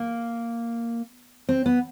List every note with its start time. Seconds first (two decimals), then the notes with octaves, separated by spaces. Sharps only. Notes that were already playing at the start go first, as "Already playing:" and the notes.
Already playing: A#3
1.49 C4
1.66 B3